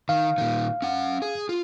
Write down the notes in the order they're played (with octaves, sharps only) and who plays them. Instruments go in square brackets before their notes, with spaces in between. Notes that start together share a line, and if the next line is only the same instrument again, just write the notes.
[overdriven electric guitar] D#3 [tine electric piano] F5
[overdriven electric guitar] A#2 D#3
C#4 F#5
G#4
F4